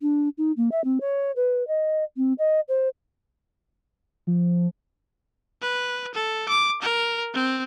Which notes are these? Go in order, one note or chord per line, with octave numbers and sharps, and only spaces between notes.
D4
D#4
A#3
E5
C4
C#5
B4
D#5
C4
D#5
C5
F3
B4
A4
D6
A#4
C4